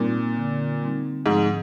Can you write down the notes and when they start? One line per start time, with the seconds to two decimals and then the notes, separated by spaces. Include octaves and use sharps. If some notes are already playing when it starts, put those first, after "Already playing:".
Already playing: A#2 G3 C4 D#4
0.37 D3
0.82 G3 C4 D#4
1.26 G#2 F3